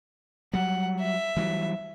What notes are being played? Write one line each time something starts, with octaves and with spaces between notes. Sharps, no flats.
F#3 G3 F#5
E5
E3 F#3 G3